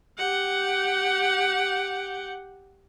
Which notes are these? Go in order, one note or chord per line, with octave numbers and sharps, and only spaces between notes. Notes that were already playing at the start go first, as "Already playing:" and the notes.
G4 F#5